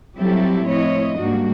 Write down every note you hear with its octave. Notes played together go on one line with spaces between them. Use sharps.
F#3 G3 C4 E4 G4 A4
A2 F3 C4 E4 C#5 D#5
G#2 G3 A#3 D4 F#4